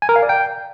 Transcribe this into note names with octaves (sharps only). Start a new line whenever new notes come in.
G#5
A#4
F5
D5
G5